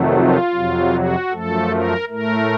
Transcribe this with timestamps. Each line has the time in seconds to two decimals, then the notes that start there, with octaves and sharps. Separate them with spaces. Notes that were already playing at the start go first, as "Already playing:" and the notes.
Already playing: F2 C3 D#3 F#3 A3
0.14 F4
0.53 F2 C3 F#3
0.92 F#4
1.31 F#2 F3 A3 A4
1.70 A#4
2.09 A2 A3 A#4